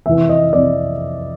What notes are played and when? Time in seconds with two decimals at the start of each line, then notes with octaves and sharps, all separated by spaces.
0.06 F2 C3 E3 E5
0.29 D#5
0.53 F2 C3 E3 D5